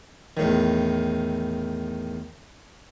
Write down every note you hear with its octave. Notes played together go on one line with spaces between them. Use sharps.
E2 A2 D#3